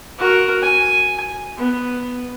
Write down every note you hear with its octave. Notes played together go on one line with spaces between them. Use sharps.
F#4 A#4
G#5
B3